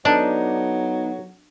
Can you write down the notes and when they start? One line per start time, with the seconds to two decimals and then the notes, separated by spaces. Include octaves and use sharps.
0.05 F#3 B3 D4 D#4 A4 D5